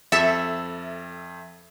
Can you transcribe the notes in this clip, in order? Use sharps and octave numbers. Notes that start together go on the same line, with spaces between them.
F2 A4 E5